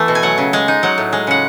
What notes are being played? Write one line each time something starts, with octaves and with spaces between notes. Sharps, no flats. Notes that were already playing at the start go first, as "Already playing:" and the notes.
Already playing: E3 A3 B3
B2
G#5
F#3 F#5
C#3
G#3 G#5
D#4
F#3 F#5
A2
G#3
C#3 F#5